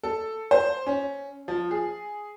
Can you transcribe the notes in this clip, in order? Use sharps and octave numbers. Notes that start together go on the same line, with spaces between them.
A4
C5
C#4
F3
G#4